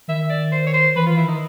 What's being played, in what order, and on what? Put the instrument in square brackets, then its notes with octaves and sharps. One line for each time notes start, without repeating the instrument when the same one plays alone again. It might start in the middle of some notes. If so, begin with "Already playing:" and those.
[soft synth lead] D#3 [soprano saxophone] E5
[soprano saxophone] D5
C5
C#5
C5
[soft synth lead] E3 [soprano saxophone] B4
[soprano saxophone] F4
[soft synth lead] E3
[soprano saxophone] E4
[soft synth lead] D#3 [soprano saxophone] D#4